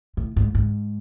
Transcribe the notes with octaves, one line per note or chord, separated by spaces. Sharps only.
A2
G#2
G#2